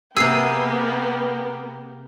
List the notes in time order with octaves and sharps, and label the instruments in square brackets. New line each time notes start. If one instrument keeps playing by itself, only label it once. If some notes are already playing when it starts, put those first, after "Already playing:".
[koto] C3 G#4 [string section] A#3 B3 [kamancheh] A#4 G5 [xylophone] E6 C7